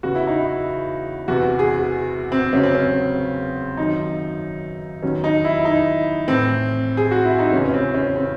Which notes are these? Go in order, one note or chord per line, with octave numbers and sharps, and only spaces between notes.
E2 C#3 E3 F#4
E4
D#4
E4
E2 C3 E3 F#4
G#4
C4
E2 C#3 F#3 C#4
C4
C#4
F#2 D#3 F#3 D#4
E2 D#3 F#3 C#4
D#4
E4
E4
D#4
A2 E3 C4
G#4
F#4
E4
D#4
E2 C#3 E3 C#4
C#4
C4
C#4
C4